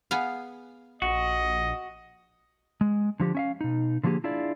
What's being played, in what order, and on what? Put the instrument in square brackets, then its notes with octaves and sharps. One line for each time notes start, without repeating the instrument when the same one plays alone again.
[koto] B3 G#4 F5
[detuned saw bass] A#1 [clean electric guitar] F#4 [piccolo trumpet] D#5
[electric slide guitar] G#3
D3 F3 G4
C#4 E5 F5
B2 D#4
D3 F3 F#3 A#3 G4 G#4
D4 E4 F4 G#4 D5